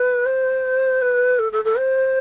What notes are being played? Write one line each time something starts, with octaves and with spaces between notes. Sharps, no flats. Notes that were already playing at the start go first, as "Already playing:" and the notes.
Already playing: B4
C5
B4
A4
A4
A4
C5